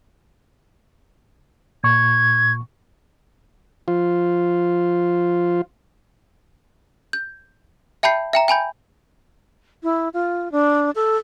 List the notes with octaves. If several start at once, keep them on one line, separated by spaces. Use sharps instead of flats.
A#2 C#6 G#6
F3 F4
G6
E5 G5 A5 B5 G6 C7
E5 G5 A#5
G5 G#5 B5 G6
E4
F4
D4
A4